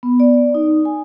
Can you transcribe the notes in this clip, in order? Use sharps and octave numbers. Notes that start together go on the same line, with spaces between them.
B3
D5
D#4
G#5